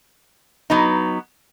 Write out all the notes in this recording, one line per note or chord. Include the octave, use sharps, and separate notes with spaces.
F#3 B3 D#4